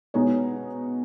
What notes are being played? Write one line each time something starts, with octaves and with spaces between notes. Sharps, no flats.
B2 G#3 B3 D#4 C#5